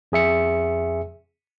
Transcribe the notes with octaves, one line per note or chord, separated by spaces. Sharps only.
F2 G#4 E5 C#7